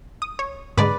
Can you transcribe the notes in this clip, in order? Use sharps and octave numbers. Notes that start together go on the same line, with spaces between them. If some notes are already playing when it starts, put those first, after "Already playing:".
D#6
C#5
G#2 D3 G#3 B4 D5